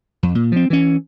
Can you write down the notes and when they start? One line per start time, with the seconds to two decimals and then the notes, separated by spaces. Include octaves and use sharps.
0.23 F2
0.35 A#2
0.52 F3 C4
0.70 E3 C#4